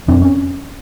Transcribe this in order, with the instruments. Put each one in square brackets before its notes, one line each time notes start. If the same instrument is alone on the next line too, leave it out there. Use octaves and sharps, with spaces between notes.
[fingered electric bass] F2 C4 D4
C#4